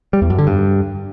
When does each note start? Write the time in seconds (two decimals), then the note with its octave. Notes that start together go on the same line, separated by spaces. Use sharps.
0.13 G3
0.22 E2
0.30 F#2
0.38 D3
0.47 G2